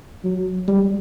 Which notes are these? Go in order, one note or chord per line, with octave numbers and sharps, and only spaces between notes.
F#3
G3